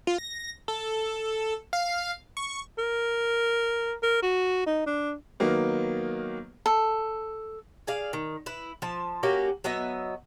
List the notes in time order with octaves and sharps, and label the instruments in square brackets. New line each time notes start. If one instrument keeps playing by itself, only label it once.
[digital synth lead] F4
A#6
A4
F5
C#6
[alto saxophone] A#4
A#4
F#4
D#4
D4
[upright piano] D#3 F#3 A#3 B3
[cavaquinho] A4
[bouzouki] G#4 D5 F5
D#3
E4 B4
F3 A5
A#3 C#4 F#4 G4
F#3 B3 D#5 E5